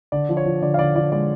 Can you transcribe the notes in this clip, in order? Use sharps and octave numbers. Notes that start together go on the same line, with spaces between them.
D3 D5
F3
C#5
F3
D3 D5
F5
D3 D5
F3 D5
G#3 D5